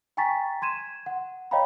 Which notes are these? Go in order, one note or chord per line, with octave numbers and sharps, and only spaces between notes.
G5 G#5 A#5 C#6 A6 B6
C6 G#6 D#7 E7
F#5
C#5 D#5 F5 G5 A#5 B5